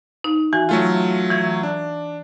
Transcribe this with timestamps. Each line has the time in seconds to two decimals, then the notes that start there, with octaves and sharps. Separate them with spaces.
0.24 D#4
0.53 E3 F#4 G#5
0.69 F#3 A3 F4
1.31 E3 G#6
1.63 D4